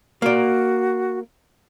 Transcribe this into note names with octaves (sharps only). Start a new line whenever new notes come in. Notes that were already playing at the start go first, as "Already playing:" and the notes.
A#3 F#4 D5